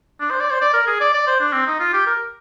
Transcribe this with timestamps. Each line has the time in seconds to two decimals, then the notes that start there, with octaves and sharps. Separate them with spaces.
0.21 D4
0.31 C5
0.41 D5
0.51 C5
0.61 D5
0.73 A#4
0.87 G#4
1.01 D5
1.14 D5
1.27 C5
1.40 D4
1.53 C4
1.67 D#4
1.80 F4
1.93 G4
2.07 A#4